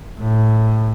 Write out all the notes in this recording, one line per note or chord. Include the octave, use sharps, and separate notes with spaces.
A2